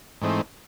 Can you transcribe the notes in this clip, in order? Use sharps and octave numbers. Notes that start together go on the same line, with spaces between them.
G#2 E3 A3 C4 D#4